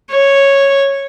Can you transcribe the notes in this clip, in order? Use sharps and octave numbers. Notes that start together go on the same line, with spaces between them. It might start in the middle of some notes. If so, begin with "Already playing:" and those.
C#5